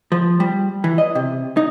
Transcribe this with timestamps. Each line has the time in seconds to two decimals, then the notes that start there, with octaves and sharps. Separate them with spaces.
0.12 F3
0.40 G3
0.84 E3
0.98 D#5
1.15 C3
1.57 D#4